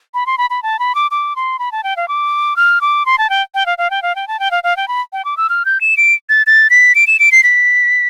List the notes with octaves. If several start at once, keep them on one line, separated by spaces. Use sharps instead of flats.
B5
C6
B5
B5
A5
B5
D6
D6
C6
B5
A5
G5
F5
D6
F6
D6
C6
A5
G5
G5
F5
F5
G5
F5
G5
A5
G5
F5
F5
G5
B5
G5
D6
E6
F6
G6
E7
D7
A6
A6
B6
D7
E7
D7
C7
B6